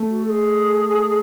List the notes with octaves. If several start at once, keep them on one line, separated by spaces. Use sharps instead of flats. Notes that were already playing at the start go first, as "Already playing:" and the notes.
Already playing: A3
F#4
A4
G#4